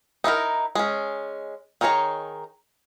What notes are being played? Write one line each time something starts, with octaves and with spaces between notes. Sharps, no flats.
D#4 E4 F#4 A#4
G#3 C#4
D#3 D#4 G#4 C#5 A#5